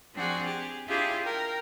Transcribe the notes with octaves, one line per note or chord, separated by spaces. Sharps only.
F3 C4 D4 F#4 G#4
G4 G#4
D4 E4 F4 G4 G#4 F5
A#4 G5